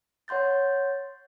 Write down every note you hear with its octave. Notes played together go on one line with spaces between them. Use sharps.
C#5 F#5 C6 G6 A6